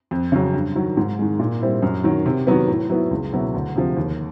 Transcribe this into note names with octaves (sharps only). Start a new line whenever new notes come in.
F2
C#3 F#3
G2
D#3 F#3
G#2
D#3 G#3
A#2
G3 C4 E4
F#2
D#3 F#3
C3
D#3 F#3 B3
A2
F#3 B3 E4
C#2
B2 F#3 B3 E4
D2
C3 F3
D#2